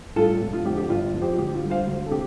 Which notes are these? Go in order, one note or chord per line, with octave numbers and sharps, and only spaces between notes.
A2 G3 F4 A4
F1
F4
F2 D3 G4
G4
G1 F4
F2 F3
G4 C5
D2 G4
F4
D3 G3
C5 F5
D2
A4
C3 G4